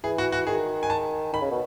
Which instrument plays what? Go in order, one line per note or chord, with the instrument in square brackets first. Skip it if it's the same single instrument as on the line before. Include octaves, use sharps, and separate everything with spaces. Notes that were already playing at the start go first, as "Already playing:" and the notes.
[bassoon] E3 [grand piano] G#4
[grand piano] F#4
F#4
[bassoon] D#3 [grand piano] G#4
[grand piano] G#5
A5
[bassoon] D#3 [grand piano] B5
[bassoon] C#3
B2